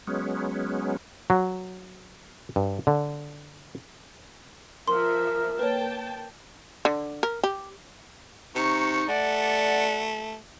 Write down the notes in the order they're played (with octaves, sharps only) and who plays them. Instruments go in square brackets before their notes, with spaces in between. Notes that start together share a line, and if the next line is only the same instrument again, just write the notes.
[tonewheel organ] F#3 G#3 B3 C#4
[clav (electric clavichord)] F#3
G2
D3
[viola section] F3 E5 [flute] A#4 [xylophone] C6
[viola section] A#3 G5 A5 [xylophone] B4 C#5
[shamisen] D3
A#4
G4
[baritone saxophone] C3 [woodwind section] D#4 C#6
[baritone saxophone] A3 [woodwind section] D5 F#5